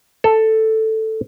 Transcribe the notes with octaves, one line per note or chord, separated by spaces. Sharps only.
A4